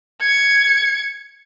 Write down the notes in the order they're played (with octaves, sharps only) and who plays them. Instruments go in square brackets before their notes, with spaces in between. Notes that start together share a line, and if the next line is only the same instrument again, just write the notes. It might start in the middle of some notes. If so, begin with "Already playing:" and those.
[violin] G#6 C#7